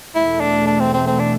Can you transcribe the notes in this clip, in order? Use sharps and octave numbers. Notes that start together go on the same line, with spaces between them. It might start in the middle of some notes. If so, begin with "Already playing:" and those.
E2 B2 A3 E4
D4
D4
C4
C4
C4
D4